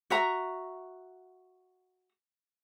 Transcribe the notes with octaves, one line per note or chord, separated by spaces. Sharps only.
F#4 E5 A#5